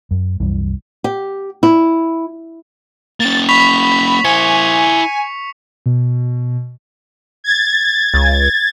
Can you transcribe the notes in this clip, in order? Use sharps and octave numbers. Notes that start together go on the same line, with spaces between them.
F#2
C2 F#2 E3 G3
G4
E4
A#3 C#4 A6
B5 C#6 B6 F7
E4 C5 G#5 C#7
B2
G#6 A6
C#2